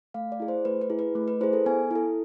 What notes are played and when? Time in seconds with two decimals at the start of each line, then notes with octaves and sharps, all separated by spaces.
0.14 A3 F5
0.32 D5
0.40 E4 G#4
0.48 C5
0.65 A3 B4
0.81 B4
0.90 E4 G#4
0.99 B4
1.15 A3
1.28 B4
1.41 E4 G#4 C5
1.53 A4
1.66 B3 G#5
1.91 E4 A4